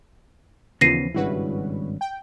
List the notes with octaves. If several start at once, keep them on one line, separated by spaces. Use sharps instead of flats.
D#2 C#3 E3 F3 B3 A#6 C7 D#7
G#1 G2 C#3 E4 F#4 B4
G5